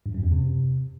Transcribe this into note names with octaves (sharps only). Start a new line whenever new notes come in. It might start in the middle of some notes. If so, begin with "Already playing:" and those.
G2
F#2
E2
C3